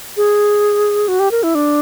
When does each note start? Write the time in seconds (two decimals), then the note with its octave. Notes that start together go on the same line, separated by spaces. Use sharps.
0.17 G#4
1.08 F#4
1.20 G4
1.31 A#4
1.43 E4
1.55 D4